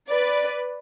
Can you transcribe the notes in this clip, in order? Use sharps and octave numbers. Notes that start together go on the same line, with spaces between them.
B4 D5